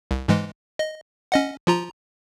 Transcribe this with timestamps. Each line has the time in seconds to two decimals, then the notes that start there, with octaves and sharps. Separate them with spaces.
0.11 C2
0.28 G#2 E3 G#3
0.79 D#5
1.32 C#4 D#5 F#5
1.67 F3 F4 A#5